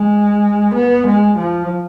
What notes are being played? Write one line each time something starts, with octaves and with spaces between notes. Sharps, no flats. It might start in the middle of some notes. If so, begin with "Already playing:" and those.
Already playing: G#3
B3
G#3
F3